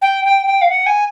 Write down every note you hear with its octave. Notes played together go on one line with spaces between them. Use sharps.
G5
G5
G5
F5
F#5
G#5